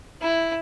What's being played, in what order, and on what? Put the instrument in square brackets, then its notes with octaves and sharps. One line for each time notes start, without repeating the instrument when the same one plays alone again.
[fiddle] E4